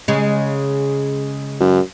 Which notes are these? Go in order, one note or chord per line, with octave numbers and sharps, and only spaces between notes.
C#3 G#3
F#2